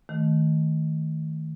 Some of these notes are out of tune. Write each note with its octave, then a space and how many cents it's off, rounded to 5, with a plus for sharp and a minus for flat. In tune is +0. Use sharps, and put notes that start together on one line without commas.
D#3 +20 A3 +0